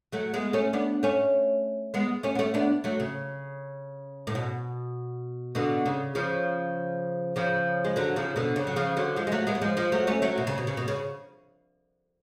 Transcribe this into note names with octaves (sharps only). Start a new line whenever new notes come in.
F#3 A3
G#3 B3
A3 C#4
B3 D4
A3 C#4
G#3 B3
A3 C#4
B3
A3 C#4
B3 D4
F#3 A3
C#3
A2
B2
B2 D3
C#3
C#3 F3
C#3 F3
G#3
D3 F#3
C#3 F3
B2 D3
C#3
F#3
C#3 F3
D3 F#3
F3 G#3
G#3
F#3 A3
G#3 B3
F#3
F3 G#3
F3 G#3
F#3 A3
A3 C#4
F#3 A3
B2
C#3
B2
C#3
B2
C#3